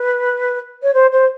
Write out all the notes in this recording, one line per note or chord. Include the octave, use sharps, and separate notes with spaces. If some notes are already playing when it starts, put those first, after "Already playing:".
Already playing: B4
C#5
C5
C5